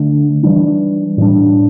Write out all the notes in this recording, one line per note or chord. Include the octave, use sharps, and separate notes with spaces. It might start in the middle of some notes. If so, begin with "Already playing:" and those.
Already playing: D3 A3 D4
E3 G3 D4
A2 E3 G3 D4